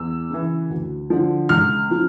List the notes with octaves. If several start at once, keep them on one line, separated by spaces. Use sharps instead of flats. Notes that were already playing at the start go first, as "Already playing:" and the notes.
Already playing: E2 E6
C#3 E3
D2
D3 F3
C#2 F6
C#3 F3